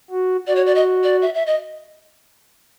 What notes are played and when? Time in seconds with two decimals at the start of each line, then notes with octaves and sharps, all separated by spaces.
0.10 F#4
0.47 F#4 D5
0.56 C#5
0.66 D5
0.75 D#5
1.03 D5
1.22 E5
1.35 E5
1.47 D#5